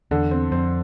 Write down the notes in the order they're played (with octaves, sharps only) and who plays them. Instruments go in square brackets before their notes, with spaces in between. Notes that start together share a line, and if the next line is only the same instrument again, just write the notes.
[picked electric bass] E2 [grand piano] D3
[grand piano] C4
[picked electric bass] F2 [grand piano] C4